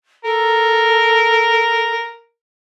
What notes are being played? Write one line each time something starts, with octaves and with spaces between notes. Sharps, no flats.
A4 A#4